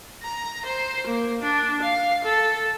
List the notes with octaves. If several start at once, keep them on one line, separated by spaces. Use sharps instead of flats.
A#5
C5
A#3
D4
F5
A4